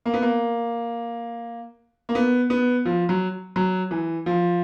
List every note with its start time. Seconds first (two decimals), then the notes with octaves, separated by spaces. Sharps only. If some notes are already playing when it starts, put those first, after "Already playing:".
0.06 A#3
0.14 B3
0.22 A#3
2.09 A#3
2.15 B3
2.50 B3
2.85 F3
3.09 F#3
3.56 F#3
3.91 E3
4.26 F3